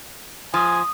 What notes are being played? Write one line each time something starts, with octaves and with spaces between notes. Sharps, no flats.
F3 G#5 D#6